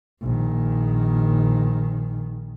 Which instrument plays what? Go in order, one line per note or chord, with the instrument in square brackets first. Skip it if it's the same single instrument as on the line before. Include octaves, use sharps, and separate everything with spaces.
[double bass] A#1 D#3